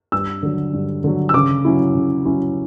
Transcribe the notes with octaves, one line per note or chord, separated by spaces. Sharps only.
G2 E6
D3 F#3
G2
D3 F#3
E6
C#3 D6
F#3 C#4 E4
C#3
F#3 C#4 E4